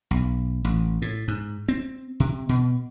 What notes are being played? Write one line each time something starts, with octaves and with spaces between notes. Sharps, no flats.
B1
A1
A2
G#2
C4
C3
B2